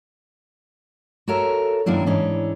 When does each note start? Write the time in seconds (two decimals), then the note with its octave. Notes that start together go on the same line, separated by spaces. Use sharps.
1.28 F#4 A4 A#4 C#5 E5
1.86 F#2 D#3 F#3 A#3 D4 E4
2.06 G#2 E3 C#4 D4